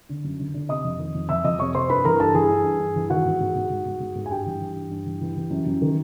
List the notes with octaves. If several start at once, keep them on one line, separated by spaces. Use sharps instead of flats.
D3
F#2
D3
D3
C3 D#5 D#6
F2
D#3
F2
F2 E5 E6
F2 D#5 D#6
C3 C#5 C#6
C3 C5 C6
G2 B4 B5
E3 A#4 A#5
G2 A4 A5
E3 G#4 G#5
G2
G2
G2
E3
D#3 F#4 F#5
G#2
G#2
G#2
G#2
G#2
G#2
G#2
G#5
G2 G4 G5
E3
E3
G2
G2
E3
E3
E3
F#2
F#2
D#3